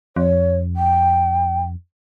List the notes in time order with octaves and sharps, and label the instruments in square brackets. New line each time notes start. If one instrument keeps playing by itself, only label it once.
[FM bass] F2 [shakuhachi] C#5
[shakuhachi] G5